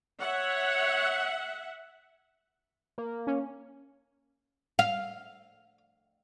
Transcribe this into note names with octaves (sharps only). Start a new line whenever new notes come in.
C#5 E5 F#5
A#3
C#4
F5